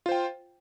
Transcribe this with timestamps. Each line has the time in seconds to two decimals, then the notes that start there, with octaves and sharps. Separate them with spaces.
0.06 F4
0.09 C5
0.12 G5